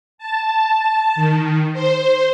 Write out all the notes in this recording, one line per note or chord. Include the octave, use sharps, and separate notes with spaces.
A5
D#3
C5